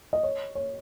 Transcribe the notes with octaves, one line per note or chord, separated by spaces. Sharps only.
D#5
C#5
C#5